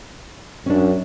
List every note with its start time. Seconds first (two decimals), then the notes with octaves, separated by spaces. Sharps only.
0.66 F#2 C#4 D4